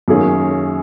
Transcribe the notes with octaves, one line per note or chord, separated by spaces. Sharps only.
F#2 D#3 A#3 C#4 G#4